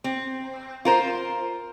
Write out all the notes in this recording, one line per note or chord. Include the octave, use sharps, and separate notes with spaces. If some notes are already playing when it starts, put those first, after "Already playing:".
C4
F4 A#4 C5